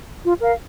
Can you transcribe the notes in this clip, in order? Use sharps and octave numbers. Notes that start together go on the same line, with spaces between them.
F4
A#4 F5